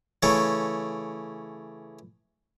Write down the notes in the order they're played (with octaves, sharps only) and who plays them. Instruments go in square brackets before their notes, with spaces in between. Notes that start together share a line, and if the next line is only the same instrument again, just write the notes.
[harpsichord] C#3 E3 A3 C#4